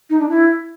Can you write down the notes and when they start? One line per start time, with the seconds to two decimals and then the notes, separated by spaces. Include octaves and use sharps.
0.10 D#4
0.19 D4
0.29 E4